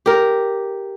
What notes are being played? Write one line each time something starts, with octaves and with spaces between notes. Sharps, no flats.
G4 A#4